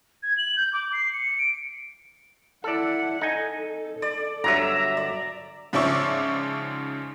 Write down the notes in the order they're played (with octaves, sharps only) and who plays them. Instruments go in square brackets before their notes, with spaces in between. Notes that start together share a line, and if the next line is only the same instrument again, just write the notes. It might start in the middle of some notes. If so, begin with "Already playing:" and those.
[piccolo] G#6
F#7
G6
D6
C7
C#7
C#7
D7
[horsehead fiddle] E4 F#5 [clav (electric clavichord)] A4 D5
[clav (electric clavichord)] D#4 G#5 [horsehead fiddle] A4
[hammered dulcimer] D5
[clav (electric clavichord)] G1 D3 F#3 [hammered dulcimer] E5 A#5
[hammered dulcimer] D5
[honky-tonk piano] G#2 C#3 F3 D5 E5 C#6